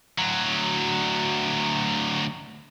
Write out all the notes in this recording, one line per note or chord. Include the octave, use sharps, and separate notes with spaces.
D2 F#3